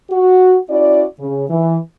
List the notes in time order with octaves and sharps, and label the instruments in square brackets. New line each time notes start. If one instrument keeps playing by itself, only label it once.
[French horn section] F#4
C#4 E4 F#4 D5
C#3
E3